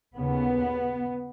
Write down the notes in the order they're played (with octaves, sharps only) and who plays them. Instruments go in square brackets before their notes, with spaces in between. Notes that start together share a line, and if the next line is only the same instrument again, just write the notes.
[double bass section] D#2 C#3 B3